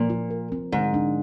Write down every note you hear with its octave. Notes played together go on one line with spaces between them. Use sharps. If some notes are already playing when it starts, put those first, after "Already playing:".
Already playing: A#2 F3
F4
A#4
C4
G#2 D3
D4